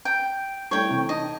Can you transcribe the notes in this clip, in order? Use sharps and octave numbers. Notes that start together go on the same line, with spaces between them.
G5
G3 A3 E4 C#5 G5
C3 E3
D#4 D#5 A5